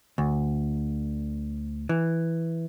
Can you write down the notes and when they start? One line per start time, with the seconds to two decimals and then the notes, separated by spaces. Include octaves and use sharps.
0.18 D2
1.89 E3